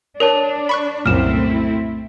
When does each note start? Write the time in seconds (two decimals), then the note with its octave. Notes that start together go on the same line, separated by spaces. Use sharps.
0.20 D4 A#4 C#5 A5
0.69 B5 C#6 F#6
1.06 C2 F#2 A#2 A3 C4 E4 F6 E7